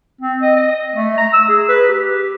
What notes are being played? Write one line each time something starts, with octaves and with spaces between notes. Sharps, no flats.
C4
D#5
D#5
A3
A#5
E6
G#4
B4
G4